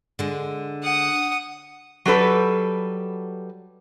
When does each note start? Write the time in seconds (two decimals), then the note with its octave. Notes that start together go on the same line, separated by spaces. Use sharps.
0.19 D3 G#3
0.83 F#5 D#6
2.06 F#3 G3 A4 B4